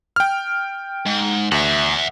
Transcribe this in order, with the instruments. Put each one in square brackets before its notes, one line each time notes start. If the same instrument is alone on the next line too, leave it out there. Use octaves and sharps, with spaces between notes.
[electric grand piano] G5 F6
[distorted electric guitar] G#2
[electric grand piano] D2 [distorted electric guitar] E5 F#5